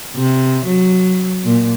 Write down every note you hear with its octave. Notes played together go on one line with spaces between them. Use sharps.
C3
F#3
A#2